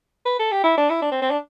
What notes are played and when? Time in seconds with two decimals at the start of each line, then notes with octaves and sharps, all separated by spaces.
0.26 B4
0.39 A4
0.52 G4
0.64 E4
0.78 D4
0.90 E4
1.02 D4
1.11 C4
1.22 C4
1.31 D4